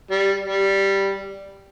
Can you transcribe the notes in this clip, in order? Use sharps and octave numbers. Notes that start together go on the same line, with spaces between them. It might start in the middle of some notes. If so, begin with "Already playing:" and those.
G3
G3